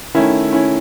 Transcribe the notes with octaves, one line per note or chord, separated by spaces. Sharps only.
D#3 A3 C#4 E4
C#4 E4